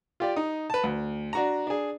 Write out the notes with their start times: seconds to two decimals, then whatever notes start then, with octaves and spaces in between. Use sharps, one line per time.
0.20 F4 G4 D5
0.36 D#4 D#6
0.70 B4 A5
0.84 D2
1.33 D4 F#4 A#5
1.67 D4 G#4